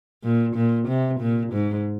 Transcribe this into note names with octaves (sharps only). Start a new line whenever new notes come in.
A#2
A#2
C3
A#2
G#2